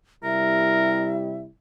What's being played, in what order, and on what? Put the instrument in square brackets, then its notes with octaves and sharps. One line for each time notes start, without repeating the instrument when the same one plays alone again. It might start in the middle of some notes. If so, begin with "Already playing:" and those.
[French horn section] C3 G3 E4 [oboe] A#4 [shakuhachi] E5